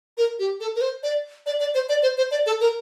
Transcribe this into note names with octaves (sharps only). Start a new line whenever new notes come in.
A#4
G4
A4
A#4
C5
D5
D5
D5
C5
D5
C5
C5
D5
A4
A#4